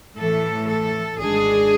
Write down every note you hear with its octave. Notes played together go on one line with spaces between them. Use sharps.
A2 E3 A3 A4
A4
G#1 G#2 G#3 D4 G#4